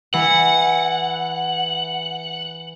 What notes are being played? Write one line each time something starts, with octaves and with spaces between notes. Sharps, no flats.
E3 F#5